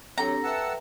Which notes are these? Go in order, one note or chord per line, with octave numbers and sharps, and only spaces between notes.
F#3 C4 D4 G4 A4 A#5
B4 E5 F#5 G5 A5 E6